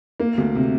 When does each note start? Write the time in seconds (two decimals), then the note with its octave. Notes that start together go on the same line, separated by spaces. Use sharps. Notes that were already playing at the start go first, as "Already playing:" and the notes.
0.20 A#3
0.38 D2
0.55 C3